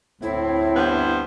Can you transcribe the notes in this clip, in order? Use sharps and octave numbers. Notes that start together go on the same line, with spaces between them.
D2 A2 C4 E4
G2 B3 C5